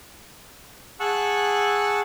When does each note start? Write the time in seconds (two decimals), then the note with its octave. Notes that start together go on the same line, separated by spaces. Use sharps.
1.00 G#4 F#5 A5 C#6 E6 F#6